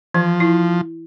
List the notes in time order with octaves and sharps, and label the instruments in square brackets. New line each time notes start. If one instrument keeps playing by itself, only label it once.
[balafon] E3 [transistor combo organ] F3
[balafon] E4